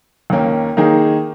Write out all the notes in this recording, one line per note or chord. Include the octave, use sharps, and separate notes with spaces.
D#2 D#3 A#3 C#4
D#3 A#3 D#4 G#4